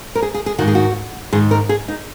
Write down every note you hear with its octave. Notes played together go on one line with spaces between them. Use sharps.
A#4
G#4
G#4
G#4
G#2 D#3 F#4
G#4
F#4
G#2 D#3 G#4
A#4
G#4
D#4